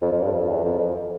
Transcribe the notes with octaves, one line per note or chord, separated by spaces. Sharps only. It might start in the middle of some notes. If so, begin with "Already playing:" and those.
F2
F2
G2
F2
E2
F2
F2